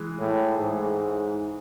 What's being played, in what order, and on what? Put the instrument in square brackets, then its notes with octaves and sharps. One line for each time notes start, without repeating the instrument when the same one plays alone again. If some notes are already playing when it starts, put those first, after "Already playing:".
Already playing: [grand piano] E3 G#3
[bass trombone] A2
G#2